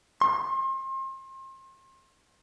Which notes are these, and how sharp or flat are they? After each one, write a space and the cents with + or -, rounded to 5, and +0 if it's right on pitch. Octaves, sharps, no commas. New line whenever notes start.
C6 +35